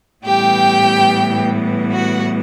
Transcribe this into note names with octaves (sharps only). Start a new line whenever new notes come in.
A2 E3 G3 B3 G4 G5
F#4 F#5